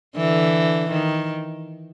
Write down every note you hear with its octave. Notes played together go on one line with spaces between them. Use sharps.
D3 E3
D#3